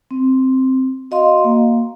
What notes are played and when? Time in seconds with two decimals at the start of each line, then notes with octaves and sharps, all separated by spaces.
0.11 C4
1.11 F#4 D#5 F5 C6
1.44 A#3